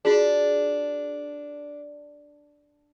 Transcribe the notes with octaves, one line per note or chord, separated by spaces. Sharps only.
D4 F4 F#4 G#4